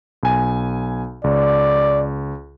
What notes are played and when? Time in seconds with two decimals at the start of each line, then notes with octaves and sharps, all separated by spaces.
0.23 B1 G#5
1.24 C#2 D5